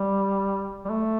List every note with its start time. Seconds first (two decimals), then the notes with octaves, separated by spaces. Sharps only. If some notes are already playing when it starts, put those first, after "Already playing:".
Already playing: G3
0.85 G3
0.90 A3